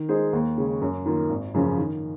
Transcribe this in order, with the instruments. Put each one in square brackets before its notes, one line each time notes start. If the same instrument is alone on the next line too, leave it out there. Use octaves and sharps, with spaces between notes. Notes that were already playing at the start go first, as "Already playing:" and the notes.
Already playing: [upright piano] D#3
G#3 D#4 G#4 C5
D#2
C#3 G#3 C#4
F#2
D#3 A#3 F4
G#1
F#2 C#3 F3
D#3